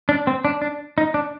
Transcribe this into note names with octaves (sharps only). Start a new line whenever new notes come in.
D4
C4
D4
D4
D#4
D4